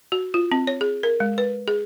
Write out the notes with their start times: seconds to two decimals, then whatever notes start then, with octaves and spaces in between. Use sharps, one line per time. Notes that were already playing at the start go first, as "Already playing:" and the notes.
0.12 F#4
0.34 F4
0.52 C4
0.67 C#5
0.81 G#4
1.03 A#4
1.20 G#3
1.38 B4
1.68 G#4